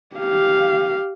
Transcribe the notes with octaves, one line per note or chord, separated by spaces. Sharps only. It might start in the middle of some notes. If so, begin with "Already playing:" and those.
G4 F5